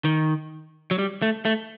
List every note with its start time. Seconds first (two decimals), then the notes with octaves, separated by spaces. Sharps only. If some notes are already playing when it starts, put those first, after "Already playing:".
0.05 D#3
0.91 F#3
0.99 G3
1.22 A3
1.45 A3